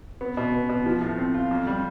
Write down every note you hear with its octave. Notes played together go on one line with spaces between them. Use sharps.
B3
B2
B3
B2
F3
A2
C4
F4
F2
G3